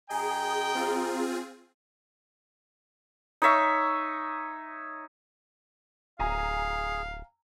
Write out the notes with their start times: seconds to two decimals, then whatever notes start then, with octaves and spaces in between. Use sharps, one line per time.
0.10 F#2 G#4 D#5 G5 A#5
0.75 C4 F4 G#4
3.42 D#4 C#5 E5 C#6
6.20 D1 G#4 F5 G#5 A#5